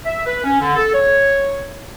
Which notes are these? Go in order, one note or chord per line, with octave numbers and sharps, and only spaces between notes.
E5
B4
C#4
D3
A4
C#5